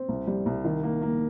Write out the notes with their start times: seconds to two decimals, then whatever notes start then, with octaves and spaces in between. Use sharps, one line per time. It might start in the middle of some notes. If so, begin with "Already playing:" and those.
Already playing: C4
0.09 C2
0.27 G3
0.46 C2
0.64 D#3
0.83 A#3
1.02 A#3